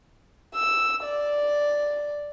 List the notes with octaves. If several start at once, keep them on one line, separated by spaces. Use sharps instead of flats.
E6
D5